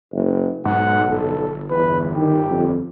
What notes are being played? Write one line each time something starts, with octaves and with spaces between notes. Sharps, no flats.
F#1
B1 G#2 F#5
G1 A4
E2 B4
D#3 G4
F2